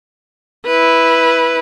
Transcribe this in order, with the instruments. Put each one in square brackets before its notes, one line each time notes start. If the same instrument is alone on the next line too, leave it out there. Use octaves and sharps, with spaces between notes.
[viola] E4 B4